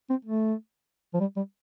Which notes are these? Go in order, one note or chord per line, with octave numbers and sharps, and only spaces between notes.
C4
A3
F3
G3
G3